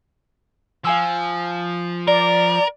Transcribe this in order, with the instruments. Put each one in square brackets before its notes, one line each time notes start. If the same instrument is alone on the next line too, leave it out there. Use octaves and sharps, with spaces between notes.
[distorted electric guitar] F3 [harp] F5 G#5 E6
[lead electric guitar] A#4 [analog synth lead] D5